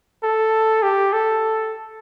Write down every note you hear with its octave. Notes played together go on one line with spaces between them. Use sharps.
A4
G4
A4